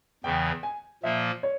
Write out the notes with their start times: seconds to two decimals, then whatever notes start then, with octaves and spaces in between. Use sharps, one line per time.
0.24 E2 C#3 E3 G5
0.63 G#5
1.03 A#2 F3 A#3 E5
1.43 C#5